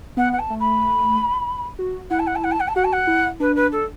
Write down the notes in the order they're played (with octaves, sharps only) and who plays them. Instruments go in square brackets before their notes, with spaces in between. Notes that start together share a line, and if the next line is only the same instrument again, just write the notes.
[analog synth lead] B3 [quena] F#5
[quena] F#5
A5
[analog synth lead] A3
[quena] B5
[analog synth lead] F#4
[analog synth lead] E4 [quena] F#5
[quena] A5
F#5
A5
F#5
A5
F#5
A5
[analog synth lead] F#4 [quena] F#5
[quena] A5
F#5
[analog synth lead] E4
[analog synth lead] D4 [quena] B4
[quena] B4
A4